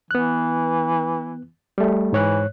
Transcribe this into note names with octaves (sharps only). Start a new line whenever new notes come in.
E3 B3 F#6
G3 A3
G#2 E3 C#5 F#6